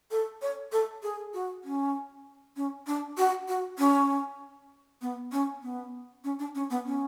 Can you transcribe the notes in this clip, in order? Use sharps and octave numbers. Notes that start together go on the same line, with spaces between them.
A4
C#5
A4
G#4
F#4
C#4
C#4
D4
F#4
F#4
C#4
B3
C#4
B3
C#4
D4
C#4
B3
C#4